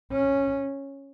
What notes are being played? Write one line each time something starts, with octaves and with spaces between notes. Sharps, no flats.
C#4